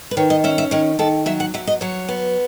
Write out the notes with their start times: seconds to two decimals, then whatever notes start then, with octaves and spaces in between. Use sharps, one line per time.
0.11 B4
0.17 D#3 C#5
0.30 D#5
0.44 C#4 E5
0.58 E5
0.71 D#3 C#5
0.99 D#3 A4
1.26 F#3 E5
1.40 F#5
1.54 F#3 E5
1.67 D#5
1.81 F#3 C#5
2.09 B3